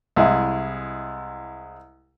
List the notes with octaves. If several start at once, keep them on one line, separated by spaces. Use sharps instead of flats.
C2 G#3 E4